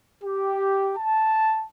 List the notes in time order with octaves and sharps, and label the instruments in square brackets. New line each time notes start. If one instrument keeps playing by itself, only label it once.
[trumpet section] G4
A5